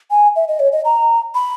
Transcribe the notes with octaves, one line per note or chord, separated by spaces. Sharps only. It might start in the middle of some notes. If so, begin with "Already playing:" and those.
G#5
E5
D#5
C#5
D#5
A#5
B5